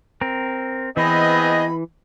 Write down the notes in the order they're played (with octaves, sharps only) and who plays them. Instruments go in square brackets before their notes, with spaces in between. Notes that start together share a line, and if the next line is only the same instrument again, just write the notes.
[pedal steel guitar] C4 A#4
[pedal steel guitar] E3 [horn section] B3 C4 G#4 [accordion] D#5 [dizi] B5